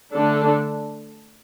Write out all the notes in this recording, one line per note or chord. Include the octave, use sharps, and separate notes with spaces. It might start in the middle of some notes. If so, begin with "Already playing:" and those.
D3 A3 D4 A4